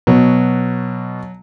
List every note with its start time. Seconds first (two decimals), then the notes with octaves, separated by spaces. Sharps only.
0.07 B2 F#3